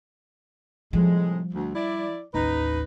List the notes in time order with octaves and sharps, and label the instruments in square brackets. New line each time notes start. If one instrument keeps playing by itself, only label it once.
[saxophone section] A2 C3 G#3 [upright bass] F3 G3
[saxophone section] D2
E4 D5
[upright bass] A1 D#2 [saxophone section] D#4 B4